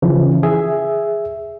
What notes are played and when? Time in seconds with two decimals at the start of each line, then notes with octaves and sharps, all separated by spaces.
0.02 C#3 E3 F3
0.43 G#4 E5